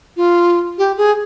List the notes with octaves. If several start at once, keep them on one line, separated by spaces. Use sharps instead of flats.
F4
G4
G#4